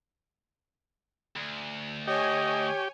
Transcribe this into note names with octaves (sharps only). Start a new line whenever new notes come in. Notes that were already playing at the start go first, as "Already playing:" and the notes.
D2
G4 C#5 D#5 G#5